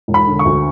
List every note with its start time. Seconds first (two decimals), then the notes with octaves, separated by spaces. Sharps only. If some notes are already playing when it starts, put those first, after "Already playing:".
0.08 E1
0.14 B5
0.27 D3
0.39 C#6
0.45 D2